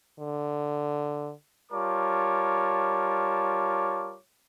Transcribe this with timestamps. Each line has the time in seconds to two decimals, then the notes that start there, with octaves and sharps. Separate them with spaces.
0.19 D3
1.72 G3 F4 A#4 C#5 A5 D6